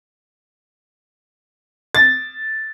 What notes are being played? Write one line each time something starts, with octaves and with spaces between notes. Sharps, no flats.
A6